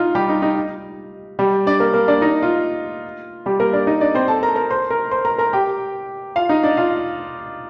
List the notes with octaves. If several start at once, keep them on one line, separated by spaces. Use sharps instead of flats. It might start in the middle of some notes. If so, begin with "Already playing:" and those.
Already playing: D#4 F4
G3 G4
D#4
D#4
G3 G4
D4 D5
A#3 A#4
A#3 A#4
D4 D5
D#4 D#5
F4
G3 G4
A#3 A#4
D4 D5
D#4 D#5
D4 D5
C4 C5
A4 A5
A#4 A#5
A#4 A#5
C5 C6
A#4 A#5
C5 C6
A#4 A#5
A#4 A#5
G4 G5
F4 F5
D#4 D#5
D4 D5
F4 F5